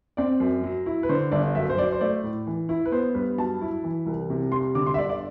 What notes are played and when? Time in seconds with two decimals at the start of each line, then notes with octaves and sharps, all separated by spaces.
0.17 C4 D5
0.40 F#2
0.64 F#3
0.86 E4
1.03 B4
1.09 D3 C5
1.32 G1 D5
1.55 F#2 E5
1.69 C5
1.77 F#3 D5
1.92 C5
2.01 A3 D5
2.23 A2
2.47 E3
2.69 E4
2.86 B4
2.92 B3 C5
3.15 G2 B4
3.38 F#3 A5
3.61 E4
3.84 E3
4.06 C2
4.30 C3
4.52 G3 C6
4.75 D3 D6
4.86 C6
4.94 E5
4.98 G1 D5
5.09 D5